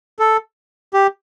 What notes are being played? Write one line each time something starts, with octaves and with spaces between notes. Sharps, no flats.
A4
G4